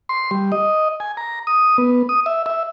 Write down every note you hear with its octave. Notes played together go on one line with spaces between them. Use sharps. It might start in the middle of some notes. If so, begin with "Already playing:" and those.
C6
G3
D#5
G#5
A#5
D#6
B3
D#6
E5
E5